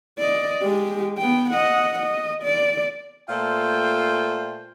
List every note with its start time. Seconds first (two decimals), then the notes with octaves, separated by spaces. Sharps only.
0.19 D5 D#5
0.62 G#3 G4
1.17 B3 G5
1.51 D#5 F#5
1.99 D#5
2.43 D5
3.29 A#2 A3 F4 A4 C5 G5